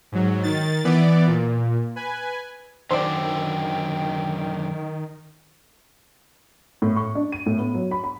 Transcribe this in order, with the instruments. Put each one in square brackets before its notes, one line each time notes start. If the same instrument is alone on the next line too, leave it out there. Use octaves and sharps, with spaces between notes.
[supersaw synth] G#2 F#3
D#3 A6
E3 B3 D5
A#2
B4 G#5
[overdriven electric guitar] F#2 D3 [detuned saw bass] D#3 [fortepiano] C5 D5 [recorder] G5
[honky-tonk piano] A2
C#6
D4
D#7
A2
B3
F#3
B5
B5